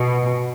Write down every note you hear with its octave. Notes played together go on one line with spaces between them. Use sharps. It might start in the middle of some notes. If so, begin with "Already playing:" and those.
Already playing: B2